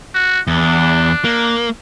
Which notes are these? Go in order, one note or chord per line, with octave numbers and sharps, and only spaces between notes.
F#4
E2 D4
A#3